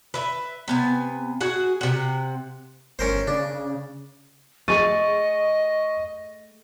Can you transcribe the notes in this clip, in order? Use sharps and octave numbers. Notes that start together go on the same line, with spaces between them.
B4 E5
C3 B3 G#5
F#4 G#4 F#5
C3 F#5
G1 C#4 A#4 C5
C#3 D4
A3 G#4 D#5 C#6 A6 D#7